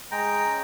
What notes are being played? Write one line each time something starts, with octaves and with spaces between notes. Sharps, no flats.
G#3 G5 A#5
C#4